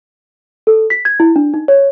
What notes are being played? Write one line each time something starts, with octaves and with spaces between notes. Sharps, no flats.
A4
B6
G#6
E4
D4
D#4
C#5